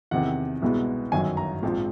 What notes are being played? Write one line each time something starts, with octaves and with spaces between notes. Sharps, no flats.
E2 C3 D#3 F#5
C2 B2 G#3 B3
G1 F#2 D#3 F#3 G#5
A#5
A#1 G#2 F3 G#3 C4